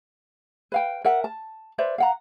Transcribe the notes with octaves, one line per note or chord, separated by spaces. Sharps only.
B4 F5 G5
A#4 E5 F#5
A5
B4 C5 D5 E5
F5 F#5 A#5